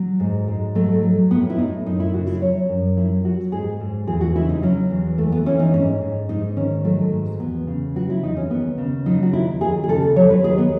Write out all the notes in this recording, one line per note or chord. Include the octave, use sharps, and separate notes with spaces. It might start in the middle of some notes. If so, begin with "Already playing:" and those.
Already playing: F#3
G#2
G#2
F#3 A3
F#3
A2 B3
E4
A2 D#4
F#2 D#4
E4
C#3 F#4
E4
F#3 C#5
F#2
F#3 E4
F#3 F#4
G#2 G#4
G#2
E2 G#4
F#4
C#3 E4
D#4
F#3 C#4
E2
E3 A3
B3
E3 C#4
D#4
G#2 C#4
G#2
G#2 D#4
D#3 C#4
F#3 A3
G#2
E2 B3
C#3
F#3 F#4
E4
E2 D#4
C#4
D#2 B3
C#3
F#3 D#4
F#4
D#2 E4
D#2 G#4
G#4
C#3 A4
F#3 C#5
B4
D#2 G#4
B3